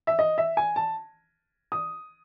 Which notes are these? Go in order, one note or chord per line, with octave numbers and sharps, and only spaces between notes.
E5
D#5
E5
G#5
A5
D#6